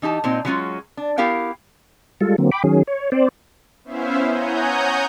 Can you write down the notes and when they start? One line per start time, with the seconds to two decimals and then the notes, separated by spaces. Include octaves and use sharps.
0.02 E3 D#4 G4 A5
0.24 A#2 C4 D#4
0.45 E3 F#3 G#3 C#4 F4 F#4
0.97 D4
1.18 B3 E4 G4 A#4 F5 G5
2.21 G3 G#3 F4 A4
2.38 D3 F#3 A#3 C4
2.51 G5 B5 D6
2.64 D#3 F#3 C#4 G#4
2.87 C#5
3.12 C4 C5 D5
3.84 B3 C#4 E4 C5 E5 F5
4.28 C#5 F#5 G#5 A#5 D#6 G6